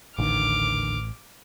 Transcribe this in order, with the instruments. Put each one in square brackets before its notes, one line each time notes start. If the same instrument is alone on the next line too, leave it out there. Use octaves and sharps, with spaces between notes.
[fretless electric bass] D#1 D3 D#3 [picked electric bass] A1 [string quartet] D6 F6